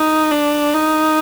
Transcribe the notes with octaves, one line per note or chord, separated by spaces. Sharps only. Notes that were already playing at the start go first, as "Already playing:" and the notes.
Already playing: D#4
D4
D#4